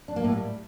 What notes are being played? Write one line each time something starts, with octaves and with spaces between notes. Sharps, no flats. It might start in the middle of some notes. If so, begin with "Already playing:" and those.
D4
A#3
A2
G3